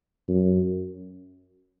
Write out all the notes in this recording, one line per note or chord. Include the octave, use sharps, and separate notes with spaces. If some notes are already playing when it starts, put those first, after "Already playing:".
F#2